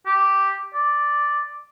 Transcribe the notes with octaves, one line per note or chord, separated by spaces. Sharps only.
G4
D5